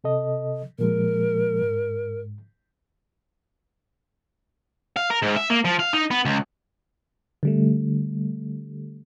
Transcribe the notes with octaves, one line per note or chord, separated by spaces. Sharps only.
C3 A4 D#5
A#2 F3 G#3 A#4
G#2
F5
A#4
G#2
E5
A#3
F3
F5
D#4
B3
C#2
D3 G3 A3